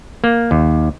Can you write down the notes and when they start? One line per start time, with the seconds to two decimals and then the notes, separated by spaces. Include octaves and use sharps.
0.24 A#3
0.51 D#2